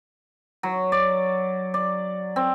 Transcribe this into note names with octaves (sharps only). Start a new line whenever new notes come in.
F#3
D5
D5
C4